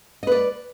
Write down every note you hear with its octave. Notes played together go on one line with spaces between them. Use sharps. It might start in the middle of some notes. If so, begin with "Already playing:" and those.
B4 D5 D#5